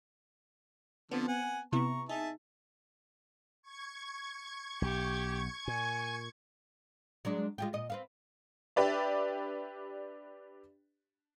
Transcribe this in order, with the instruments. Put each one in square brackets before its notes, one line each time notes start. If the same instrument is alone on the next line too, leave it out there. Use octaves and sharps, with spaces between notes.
[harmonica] D3 F3 [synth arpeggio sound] B3 C4
[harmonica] F#5 G#5
[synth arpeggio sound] C3 B3 E4 [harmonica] A#5 C#6
[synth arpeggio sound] D#4 [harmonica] G#4 E5 A5
[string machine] C#6 G#6
[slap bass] B1 [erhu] G4
[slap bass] A#2 [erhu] G#5
[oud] F#3 G#3 D4
G#3 F4 G4
A#2 D#5
C4 B4 F5
[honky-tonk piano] D4 G4 B4 D5 E5